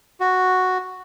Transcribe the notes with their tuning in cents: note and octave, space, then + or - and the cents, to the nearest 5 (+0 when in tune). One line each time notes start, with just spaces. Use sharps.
F#4 +0